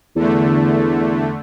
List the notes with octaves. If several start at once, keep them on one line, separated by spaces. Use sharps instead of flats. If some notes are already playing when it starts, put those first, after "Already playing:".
E2 D3 A3